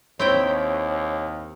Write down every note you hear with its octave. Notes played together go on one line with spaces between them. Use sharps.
D#2 C4 E4 C#5 G5